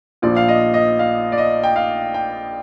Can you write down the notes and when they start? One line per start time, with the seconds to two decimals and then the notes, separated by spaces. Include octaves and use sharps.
0.22 A#1 A#2 F3 D5
0.37 F5
0.48 D#5
0.74 D#5
0.99 F5
1.32 D5
1.38 D#5
1.64 G5
1.76 F5
2.14 G5